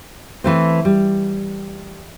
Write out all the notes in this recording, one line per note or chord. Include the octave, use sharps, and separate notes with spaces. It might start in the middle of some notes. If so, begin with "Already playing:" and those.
E3 A3 C4
G3